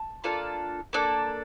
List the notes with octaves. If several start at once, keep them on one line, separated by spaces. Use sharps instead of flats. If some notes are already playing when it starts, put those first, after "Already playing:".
Already playing: A5
A#3 D4 F4 A4
A#3 D4 A4